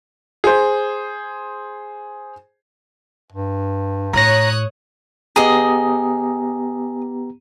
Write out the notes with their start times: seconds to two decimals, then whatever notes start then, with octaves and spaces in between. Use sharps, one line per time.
0.44 G#4 C5
3.32 G2
4.13 A2 C#5 A#5 D#6 F#6 A#6
5.36 B3 G4 G#4 D#5 A#5